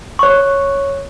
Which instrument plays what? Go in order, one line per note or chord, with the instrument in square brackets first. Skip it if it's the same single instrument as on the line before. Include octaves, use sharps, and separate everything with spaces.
[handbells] C#5 C#6